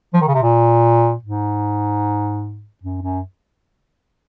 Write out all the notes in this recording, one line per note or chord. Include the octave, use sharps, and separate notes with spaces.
F3
D#3
C#3
C3
A#2
G#2
F#2
F#2